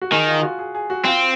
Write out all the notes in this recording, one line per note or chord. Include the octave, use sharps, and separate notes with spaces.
F#4
D#3 G#4
F4
F4
F#4
G#4
G#4
F#4
C4 F4